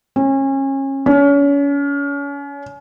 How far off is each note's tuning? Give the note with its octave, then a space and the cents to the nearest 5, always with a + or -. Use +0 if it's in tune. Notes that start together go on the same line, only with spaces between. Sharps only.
C#4 -30
C#4 +35